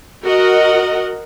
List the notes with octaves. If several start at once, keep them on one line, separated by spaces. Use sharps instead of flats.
F#4 A#4 D#5 F#5